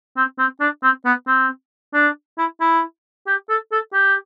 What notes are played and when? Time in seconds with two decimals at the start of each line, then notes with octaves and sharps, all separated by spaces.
0.17 C4
0.39 C4
0.61 D4
0.83 C4
1.06 B3
1.28 C4
1.94 D4
2.38 E4
2.61 E4
3.27 G4
3.50 A4
3.72 A4
3.93 G4